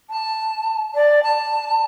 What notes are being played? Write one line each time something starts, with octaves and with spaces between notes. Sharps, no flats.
A5
D5
A5